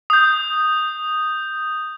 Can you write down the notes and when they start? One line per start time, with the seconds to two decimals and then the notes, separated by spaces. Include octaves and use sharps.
0.10 D#6 G6